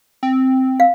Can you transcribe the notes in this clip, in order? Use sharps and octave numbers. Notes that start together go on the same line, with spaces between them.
C4
F5